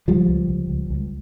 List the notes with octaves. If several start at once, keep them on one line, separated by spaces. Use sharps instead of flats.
C#2 F3 G3
C#2
C#2
C#2
C#2